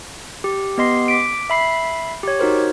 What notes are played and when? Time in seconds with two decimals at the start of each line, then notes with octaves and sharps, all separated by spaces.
0.44 G4
0.78 B3 G4 D#5 C6 C7
1.08 D6 B6 D7
1.50 E5 B5 C7
2.23 G4 C#5
2.39 D#4 F#4 A#4 C5